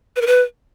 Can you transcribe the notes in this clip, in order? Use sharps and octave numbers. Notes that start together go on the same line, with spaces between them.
B4
A#4
B4